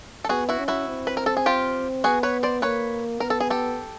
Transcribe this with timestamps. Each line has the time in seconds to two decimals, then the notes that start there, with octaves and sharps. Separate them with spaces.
0.24 A4
0.29 B3 F#4 G#4
0.49 E4 F#4
0.58 C#4
0.68 E4 F#4
0.88 C4
1.07 B4
1.17 A#4
1.26 A4
1.37 G#4
1.46 F4 G4
2.04 B3 F#4 G#4
2.23 B4 C#5
2.43 C5 D5
2.62 A#3 B4 C#5
3.20 B3 A#4
3.30 A4
3.40 G#4
3.50 G4 A4